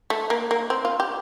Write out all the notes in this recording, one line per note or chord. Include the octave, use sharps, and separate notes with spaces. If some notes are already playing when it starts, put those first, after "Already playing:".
A3
A#3
A#3
C4
F4
G4